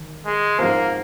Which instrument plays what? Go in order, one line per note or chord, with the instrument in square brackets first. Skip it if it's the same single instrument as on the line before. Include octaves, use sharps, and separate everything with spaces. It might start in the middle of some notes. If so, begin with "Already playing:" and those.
Already playing: [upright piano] D#3
[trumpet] G#3
[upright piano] G#2 F3 C4 [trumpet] A#3